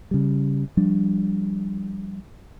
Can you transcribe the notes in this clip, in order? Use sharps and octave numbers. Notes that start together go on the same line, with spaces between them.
C#3 G3
F3 G3 D4